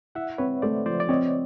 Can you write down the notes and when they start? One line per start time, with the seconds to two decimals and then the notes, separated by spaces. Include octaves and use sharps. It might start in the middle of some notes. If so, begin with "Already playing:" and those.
0.15 E4 E5 F#5
0.38 C4 B4 C#5
0.62 A3 C5 D5
0.86 F3 C5 D5
1.00 D5
1.09 C4 C#5 D#5